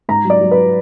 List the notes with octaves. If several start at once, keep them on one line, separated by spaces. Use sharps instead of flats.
G#2 A#5
F#3
D5
F#3
B4